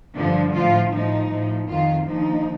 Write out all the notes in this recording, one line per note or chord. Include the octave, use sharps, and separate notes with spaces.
G2 D3 F3 D4
A2 F3 F4
A2 F3 D#4
A2 F3
F2 D#3 F4
D#2 D3 F3 D#4